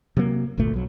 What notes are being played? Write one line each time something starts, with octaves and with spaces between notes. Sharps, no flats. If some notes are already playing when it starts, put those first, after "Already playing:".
C3 F#3 A#3
G1 D2 A#2 A3
B1 F#3